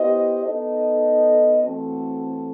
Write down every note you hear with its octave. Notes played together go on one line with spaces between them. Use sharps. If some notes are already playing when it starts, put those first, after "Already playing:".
Already playing: B3 E4 G4 C5 D#5
B3 D#4 A4 D#5
E3 A3 C4 F#4 A4